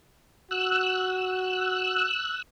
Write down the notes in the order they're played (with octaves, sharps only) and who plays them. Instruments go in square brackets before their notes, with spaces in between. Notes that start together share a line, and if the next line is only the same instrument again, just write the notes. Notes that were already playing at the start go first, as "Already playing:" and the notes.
[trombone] F#4 [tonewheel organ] E6 F#6